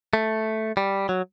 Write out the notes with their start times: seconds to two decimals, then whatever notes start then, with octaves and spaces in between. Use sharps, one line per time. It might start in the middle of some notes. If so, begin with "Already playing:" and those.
0.13 A3
0.77 G3
1.09 F#3